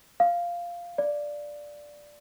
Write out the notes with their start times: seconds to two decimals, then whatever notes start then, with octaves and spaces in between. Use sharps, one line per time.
0.20 F5
0.98 D5